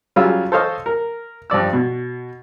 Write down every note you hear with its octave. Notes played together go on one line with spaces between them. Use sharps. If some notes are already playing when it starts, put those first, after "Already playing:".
C#3 F#3 G3 F4 E6
A4 C5 C#5 D#5 F5
A#4
G2 F3 D5 E6
B2